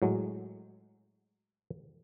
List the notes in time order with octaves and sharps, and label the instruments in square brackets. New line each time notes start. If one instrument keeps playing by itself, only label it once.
[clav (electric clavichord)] A2 F#3 G#3